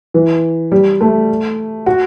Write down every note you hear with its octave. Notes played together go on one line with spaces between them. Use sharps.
E3
G3
A3
F#4